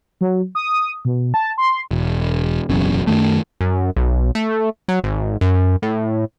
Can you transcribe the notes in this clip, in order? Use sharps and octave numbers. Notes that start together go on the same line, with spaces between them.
F#3
D#6
B2
A5
C6
E1
F#1 B1 E2 C#4
F#2 D#3 A3
F#2
B1
A3
F#3
G#1
F#2
A2